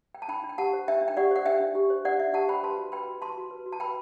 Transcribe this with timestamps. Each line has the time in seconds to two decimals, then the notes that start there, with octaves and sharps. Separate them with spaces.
0.15 G5
0.22 A5
0.28 D4 G5 B5
0.44 D4
0.49 G5
0.58 G4 F#5 A5
0.73 C5
0.88 D4 E5 G5
1.02 D4
1.08 G5
1.17 G4 D5 F#5
1.31 C5 F#5
1.46 D4 E5 G5
1.60 D4
1.75 G4
1.90 C5
2.05 D4 D5 F#5
2.19 D4 E5
2.33 G4 F#5 A5
2.48 C5 G5 B5
2.63 B4 A5 C6
2.78 F#4
2.92 B4 G5 B5
3.08 F#4
3.22 B4 A5 C6
3.37 F#4
3.51 B4
3.66 F#4
3.72 A5
3.80 B4 G5 B5